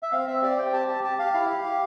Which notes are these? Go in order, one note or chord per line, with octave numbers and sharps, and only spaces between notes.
E5
C4 F5
C4 E5
G4 D5
C4 G5
G4 A5
G4 A5
G4 A5
G4 F5
E4 F5
G4
G4